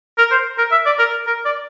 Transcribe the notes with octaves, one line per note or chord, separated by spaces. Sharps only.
A#4
C5
A#4
E5
D5
A#4
A#4
D5